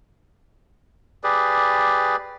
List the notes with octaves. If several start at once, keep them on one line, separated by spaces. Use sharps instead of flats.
G4 G#4 B4 D5